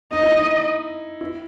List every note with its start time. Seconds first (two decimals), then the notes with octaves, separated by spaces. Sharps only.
0.13 D#4 D#5
0.23 E4
0.33 D#4
1.21 E4